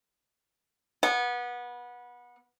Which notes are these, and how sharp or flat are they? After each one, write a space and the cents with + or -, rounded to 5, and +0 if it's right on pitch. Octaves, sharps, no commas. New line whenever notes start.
B3 -25